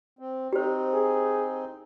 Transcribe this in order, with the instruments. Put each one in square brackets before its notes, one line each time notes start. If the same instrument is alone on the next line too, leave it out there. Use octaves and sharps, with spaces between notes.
[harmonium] C4
[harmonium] C4 D#4 [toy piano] G4 C5
[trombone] G#4